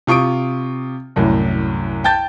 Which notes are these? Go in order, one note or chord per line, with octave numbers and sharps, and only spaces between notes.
C3 F4 C#6 D#6 D7
C2 F#2 A2
G5 A5 G6 A6